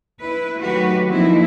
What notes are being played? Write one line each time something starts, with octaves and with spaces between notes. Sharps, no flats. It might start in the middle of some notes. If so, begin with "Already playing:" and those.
E4 B4
D#3 F#3 A3 F#4 G4 B4
F3 A#3 C4 D#4 E4